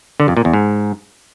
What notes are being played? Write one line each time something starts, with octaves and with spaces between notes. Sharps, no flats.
D3
F2
A#2
E2
G#2